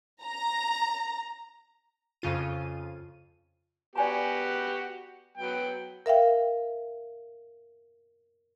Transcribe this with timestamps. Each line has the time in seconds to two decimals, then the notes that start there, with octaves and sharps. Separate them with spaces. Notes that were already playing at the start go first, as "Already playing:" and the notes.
0.23 A#5
2.22 F2 C#3 F4 D#7
3.95 B3 F#4 G4 D5 G#5 A#5
5.38 F#3 B3 G5
6.06 A#4 E5 F5 G5